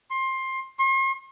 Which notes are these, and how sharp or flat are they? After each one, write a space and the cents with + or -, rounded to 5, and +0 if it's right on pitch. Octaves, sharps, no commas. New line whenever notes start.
C6 +20
C6 +45